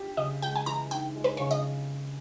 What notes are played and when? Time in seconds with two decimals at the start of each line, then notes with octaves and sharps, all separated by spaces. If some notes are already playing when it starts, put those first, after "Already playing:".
Already playing: G4
0.17 C#3 D#5
0.42 G#3 G5
0.56 G#5
0.66 E3 A#5
0.91 D#4 G5
1.16 G#3
1.24 B4
1.37 C#3 C#5
1.51 D#5